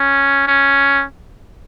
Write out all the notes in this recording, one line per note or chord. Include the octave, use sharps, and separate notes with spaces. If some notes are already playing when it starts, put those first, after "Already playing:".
Already playing: C#4
C#4